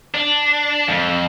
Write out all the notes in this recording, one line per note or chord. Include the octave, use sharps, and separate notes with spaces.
D4
F2